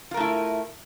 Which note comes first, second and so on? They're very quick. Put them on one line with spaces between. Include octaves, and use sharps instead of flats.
F4 A#4 A3 E4